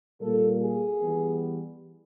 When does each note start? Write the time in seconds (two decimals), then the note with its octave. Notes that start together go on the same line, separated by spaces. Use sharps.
0.20 A#2 G3 A#3 A4
0.60 G#4
1.00 E3 G3 B3